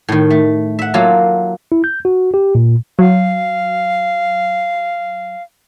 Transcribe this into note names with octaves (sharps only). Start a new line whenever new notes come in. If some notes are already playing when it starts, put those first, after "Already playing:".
A2 D#3
A3
E5 F#5
F#3 A#3 F4 A4
E4
G6
F#4
G4
A#2
F#3 F5